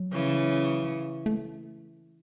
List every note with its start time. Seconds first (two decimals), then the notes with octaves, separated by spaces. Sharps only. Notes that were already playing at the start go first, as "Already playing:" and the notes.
Already playing: F#3
0.13 C#3 E3
1.26 A3